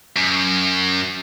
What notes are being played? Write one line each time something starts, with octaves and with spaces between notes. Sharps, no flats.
F#2